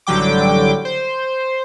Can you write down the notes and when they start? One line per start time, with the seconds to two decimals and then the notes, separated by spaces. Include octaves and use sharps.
0.07 A1 D3 F#3 G3 G5 D6
0.85 C5